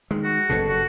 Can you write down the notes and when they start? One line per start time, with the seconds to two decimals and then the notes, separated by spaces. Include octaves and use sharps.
0.11 D#3 G#3
0.24 F#4
0.49 F#1 G2 B2 A4
0.68 F#4